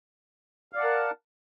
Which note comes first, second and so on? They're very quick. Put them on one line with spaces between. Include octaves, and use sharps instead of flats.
F5 D5 F#5 A5 A#4